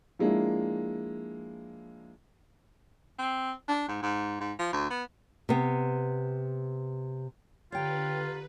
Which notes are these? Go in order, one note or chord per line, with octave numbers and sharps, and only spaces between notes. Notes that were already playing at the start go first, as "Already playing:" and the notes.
F3 G#3 A#3 D4 E4
C4
D4
G#2
G#2
G#2
F3
D2
B3
C3 B3
D3 F4 G4 B4 C#5 G5 A#5